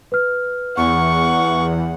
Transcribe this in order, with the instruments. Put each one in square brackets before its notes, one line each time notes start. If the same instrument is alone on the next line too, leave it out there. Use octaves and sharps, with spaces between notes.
[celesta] B4 F6
[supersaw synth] E2 [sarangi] F#5 [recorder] C#6